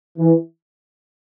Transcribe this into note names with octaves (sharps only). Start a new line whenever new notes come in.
E3